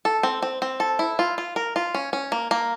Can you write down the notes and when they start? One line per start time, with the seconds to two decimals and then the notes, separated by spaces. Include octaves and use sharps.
0.05 A4
0.23 C4
0.42 C4
0.62 C4
0.80 A4
0.99 E4
1.19 F4
1.38 F4
1.56 A#4
1.76 F4
1.95 C#4
2.13 C#4
2.32 A#3
2.51 A#3